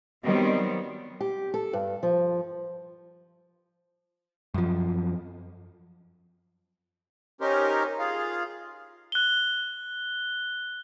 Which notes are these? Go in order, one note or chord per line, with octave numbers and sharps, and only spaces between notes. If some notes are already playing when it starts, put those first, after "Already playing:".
D#3 F#3 G3 B3 C4
G4
A4
G2
F3
F#2 F3
C#4 D#4 G4 A#4 C5
F4 G#4 F5
F#6 G7